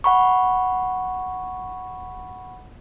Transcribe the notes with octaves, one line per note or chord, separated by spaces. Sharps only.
F#5 B5 C#6